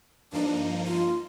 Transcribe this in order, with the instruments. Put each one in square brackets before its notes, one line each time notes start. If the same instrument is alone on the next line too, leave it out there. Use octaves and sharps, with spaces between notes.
[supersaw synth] G2 F3 A#3 D#4 [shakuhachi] D4
[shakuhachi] F4